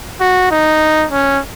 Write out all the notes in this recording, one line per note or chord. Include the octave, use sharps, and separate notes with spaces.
F#4
D#4
C#4